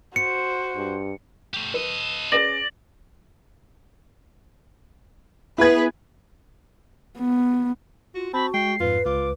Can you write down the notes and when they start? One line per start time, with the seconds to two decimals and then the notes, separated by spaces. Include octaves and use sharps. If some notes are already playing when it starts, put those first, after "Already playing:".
0.16 F#4 C5 C#7
0.76 G2
1.54 A3 G4
1.74 A4 B4 D#5
2.32 C#4 G#4 B4 D5 A#6 F#7
5.58 B3 E4 G#4 B4 G#6
7.18 B3
8.15 F4 F#4
8.34 C4 F#4 A5 B5
8.54 G#3 G5 C7
8.80 F2 G#2 F4 B4
9.05 C#2 F4 D6